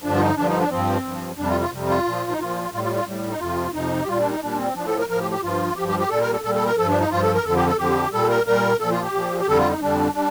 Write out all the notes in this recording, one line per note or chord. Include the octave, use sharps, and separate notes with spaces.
G2 D3 F3 D4
F4
D#4
G2 D3 F3 D4
D#4
D4
G2 F3 C4
G2 F3
F2 C3 G3 D4
F4
F4
F2 C3 G3
F4
A#2 F3
D#4
A#2 F3 F4
A2 G3 F4
F4
F4
A2 G3
D#4
F2 C3 F3 F4
F2 C3 F3 D#4
G4
A#2 G3 F4
D4
D#4
A#2 G3 D4
C4
A2 F3 D4
A4
A#4
A2 F3 A#4
G4
G4
G2 F3 F4
G2 F3 G4
G4
G4
A#2 G3 A4
A#4
A4
A#2 G3 A4
A4
A#4
G2 F3 A4
D4
D#4
G2 F3 F4
A4
A#4
F2 D3 F3 A4
G4
A4
F2 D3 F3 G4
A#2 G3 A4
A#4
A#2 G3 A#4
A#2 A4
F3
F4
G4
A#2 F3
G4
F2 D3 G3 A4
F4
D#4
F2 D3 G3 D4
G3 D4